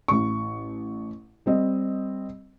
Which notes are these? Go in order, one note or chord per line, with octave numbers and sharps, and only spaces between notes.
A1 C#6
G3 C4 D#5